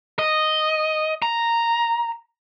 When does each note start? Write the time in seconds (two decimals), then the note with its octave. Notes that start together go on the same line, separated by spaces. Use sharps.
0.19 D#5
1.22 A#5